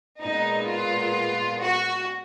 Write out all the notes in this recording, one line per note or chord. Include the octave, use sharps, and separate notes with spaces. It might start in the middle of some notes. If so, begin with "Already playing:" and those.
A#2 G#3 B3 D#4
F4
F#4